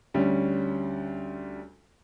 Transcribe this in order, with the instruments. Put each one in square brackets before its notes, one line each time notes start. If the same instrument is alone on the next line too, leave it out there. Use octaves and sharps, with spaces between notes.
[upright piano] D2 G3 C#4